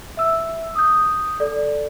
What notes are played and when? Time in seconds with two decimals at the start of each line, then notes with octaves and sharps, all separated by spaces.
0.17 E5 E6
0.75 D#6 G6
1.40 A4 D5